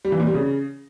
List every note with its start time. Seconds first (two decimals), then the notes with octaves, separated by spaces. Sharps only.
0.05 G3
0.12 E3
0.20 A#2
0.27 G3
0.34 C#3